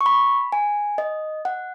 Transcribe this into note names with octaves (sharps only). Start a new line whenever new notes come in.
C#6
B5
G#5
D#5
F#5